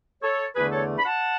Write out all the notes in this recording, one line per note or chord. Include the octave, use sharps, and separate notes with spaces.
A4 C#5
E2 D3 A3 D4 G#4 B4
A4 C#5
B5
F#5 A5